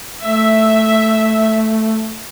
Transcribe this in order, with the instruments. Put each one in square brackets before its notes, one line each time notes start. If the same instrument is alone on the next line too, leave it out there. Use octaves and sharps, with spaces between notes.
[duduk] A3 [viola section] E5